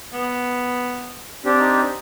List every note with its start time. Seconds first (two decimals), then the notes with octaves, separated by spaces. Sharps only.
0.14 B3
1.45 C4 D4 G4
1.60 D#4